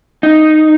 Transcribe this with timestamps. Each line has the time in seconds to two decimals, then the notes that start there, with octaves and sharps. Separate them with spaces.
0.23 D#4